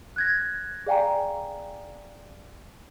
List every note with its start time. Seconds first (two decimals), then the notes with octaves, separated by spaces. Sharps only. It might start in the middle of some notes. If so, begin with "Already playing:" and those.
0.16 F#6 G#6 A#6
0.86 G#4 D5 F5 G5 G#5 A#5